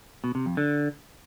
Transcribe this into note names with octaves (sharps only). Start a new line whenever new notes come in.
B2
C3
F2
D3